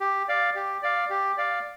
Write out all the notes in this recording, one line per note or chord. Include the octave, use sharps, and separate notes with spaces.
G4
D5 F5
G4
D5 F5
G4
D5 F5